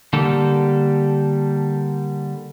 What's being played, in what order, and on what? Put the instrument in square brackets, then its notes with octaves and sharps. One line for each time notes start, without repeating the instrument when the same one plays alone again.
[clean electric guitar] D3 G3 A#3 G4 A4